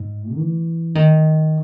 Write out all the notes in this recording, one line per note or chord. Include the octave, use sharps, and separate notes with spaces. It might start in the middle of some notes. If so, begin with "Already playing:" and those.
Already playing: G#2
E3
D#3